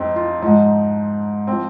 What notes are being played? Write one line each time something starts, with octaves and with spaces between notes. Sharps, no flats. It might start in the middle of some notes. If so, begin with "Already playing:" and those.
Already playing: F2 C4 D#4
F4
G#2 F3 D#4
F3 C4